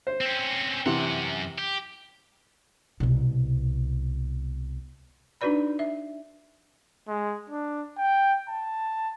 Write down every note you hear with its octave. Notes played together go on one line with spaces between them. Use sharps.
C5
C4 C#4
F#2 C3 E3 F#5
G4
C2 B2
D4 D#4 F#4 B4 D5 B5
E5
G#3
D4
G5
A5